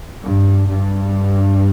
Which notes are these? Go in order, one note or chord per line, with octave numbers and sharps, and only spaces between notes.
G2
G2